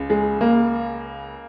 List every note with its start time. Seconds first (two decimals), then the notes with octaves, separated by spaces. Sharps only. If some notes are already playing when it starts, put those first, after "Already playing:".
Already playing: C#2 C#3
0.10 G#3
0.41 A#3